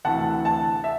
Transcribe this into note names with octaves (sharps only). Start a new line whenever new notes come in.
D2 C3 E3 F#5 A5
F#5 A5
E5